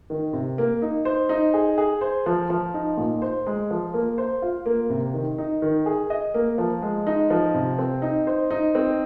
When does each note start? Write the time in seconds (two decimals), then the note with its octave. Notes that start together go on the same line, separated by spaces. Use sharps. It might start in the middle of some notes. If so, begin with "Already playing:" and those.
0.10 D#3
0.33 C3
0.58 A#3
0.82 D#4
1.05 C5
1.29 D#4
1.54 G#4
1.78 G#4
2.01 C5
2.26 F3
2.50 F3
2.74 D#4
2.97 A#2
3.22 C5
3.46 G#3
3.70 F3
3.94 A#3
4.18 C5
4.42 F4
4.66 A#3
4.90 C3
5.14 D#3
5.38 D#4
5.62 D#3
5.86 G#4
6.10 D#5
6.34 A#3
6.58 F3
6.82 G#3
7.07 D#4
7.30 F3
7.54 C3
7.79 C4
8.02 D#4
8.27 C5
8.51 D#4
8.75 C4